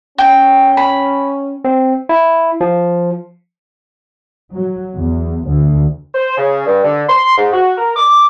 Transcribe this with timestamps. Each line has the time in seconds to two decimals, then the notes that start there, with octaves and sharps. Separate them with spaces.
0.18 C#4 G5
0.77 B5
1.65 C4
2.09 E4
2.61 F3
4.54 F#3
4.96 E2
5.48 D2
6.14 C5
6.38 C#3
6.67 G2
6.83 D3
7.09 C6
7.38 G#2
7.52 F#4
7.78 A#4
7.96 D6